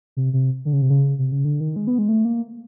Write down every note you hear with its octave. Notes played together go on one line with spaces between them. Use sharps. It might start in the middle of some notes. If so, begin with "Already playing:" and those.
C3
C3
D3
C#3
C3
C#3
C3
C#3
D3
D#3
G#3
B3
G#3
A3
A#3